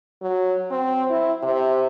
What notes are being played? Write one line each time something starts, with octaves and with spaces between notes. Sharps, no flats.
F#3
C4
E4
C3